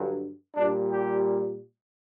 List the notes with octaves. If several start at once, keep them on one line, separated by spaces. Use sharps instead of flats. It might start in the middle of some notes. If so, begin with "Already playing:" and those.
Already playing: G2 D3 F#3
A#2 G3 D4
G4